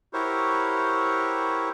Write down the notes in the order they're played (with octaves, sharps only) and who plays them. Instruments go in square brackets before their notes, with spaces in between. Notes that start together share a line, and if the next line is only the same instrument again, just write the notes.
[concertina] E4 F#4 G4 A#4 C5 C#5